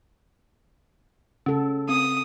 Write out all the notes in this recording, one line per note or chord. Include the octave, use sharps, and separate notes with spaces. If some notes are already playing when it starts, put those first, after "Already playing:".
C#3 C#4 A4
C4 D#6